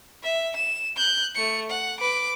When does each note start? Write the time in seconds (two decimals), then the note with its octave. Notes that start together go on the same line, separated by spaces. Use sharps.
0.23 E5
0.56 E7
0.96 F#6 G6
1.35 A3 C#7
1.70 F#5
2.00 B4 D6